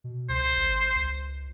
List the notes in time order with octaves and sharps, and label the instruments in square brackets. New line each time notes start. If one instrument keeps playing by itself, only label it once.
[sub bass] B2
[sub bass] C#2 [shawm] C5
[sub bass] G#1
C#2